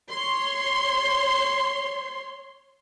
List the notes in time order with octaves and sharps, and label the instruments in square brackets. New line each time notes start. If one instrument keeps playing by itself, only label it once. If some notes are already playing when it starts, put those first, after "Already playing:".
[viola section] C#5 C6